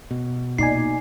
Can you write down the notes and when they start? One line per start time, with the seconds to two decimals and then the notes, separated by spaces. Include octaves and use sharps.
0.11 B2
0.58 A#2 D#4 D5 G#5 C7